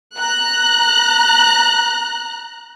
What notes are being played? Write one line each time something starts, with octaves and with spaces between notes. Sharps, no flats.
A#5 F#6